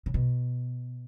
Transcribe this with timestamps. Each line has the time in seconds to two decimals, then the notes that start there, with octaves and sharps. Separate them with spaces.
0.06 C#3
0.14 B2